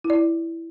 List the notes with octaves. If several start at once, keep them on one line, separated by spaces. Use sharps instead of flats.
E4
D5
E4